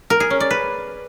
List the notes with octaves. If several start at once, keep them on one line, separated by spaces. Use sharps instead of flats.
A#4
G#4
C#4
D5
B4